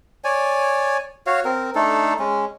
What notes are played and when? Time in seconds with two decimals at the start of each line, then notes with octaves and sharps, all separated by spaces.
0.24 C#5 D5 G#5
1.27 F#4 C#5 F5
1.45 C4 A#4
1.75 A3 D4 D#4 A4
2.19 G#3 C#4